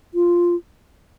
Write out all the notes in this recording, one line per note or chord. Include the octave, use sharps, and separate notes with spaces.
F4